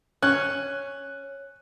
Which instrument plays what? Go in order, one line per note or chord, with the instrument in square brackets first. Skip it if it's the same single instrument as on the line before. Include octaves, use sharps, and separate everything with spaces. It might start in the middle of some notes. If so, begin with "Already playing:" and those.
[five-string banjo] C#4 [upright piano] F#6